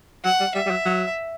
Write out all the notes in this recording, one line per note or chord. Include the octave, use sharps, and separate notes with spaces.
F#3 F#5
G3
G3 E5
G3
F#3
F#3